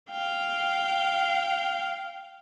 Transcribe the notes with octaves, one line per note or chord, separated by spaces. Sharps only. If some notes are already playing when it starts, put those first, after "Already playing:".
F5 G5